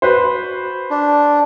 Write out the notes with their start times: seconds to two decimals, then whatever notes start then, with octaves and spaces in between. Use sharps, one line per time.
0.02 F#4 B4 C5
0.90 D4